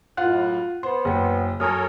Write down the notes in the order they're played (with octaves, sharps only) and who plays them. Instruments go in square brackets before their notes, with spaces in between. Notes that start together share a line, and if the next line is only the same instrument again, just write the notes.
[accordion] F#2 A2 [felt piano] F4 F5 F#5 [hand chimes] F#6
[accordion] B3 [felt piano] C5 [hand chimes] C6
[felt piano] F#1 [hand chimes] C#5 G5
[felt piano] F#2 [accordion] A4 A#4 C#5 [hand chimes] G#5 D#6 F6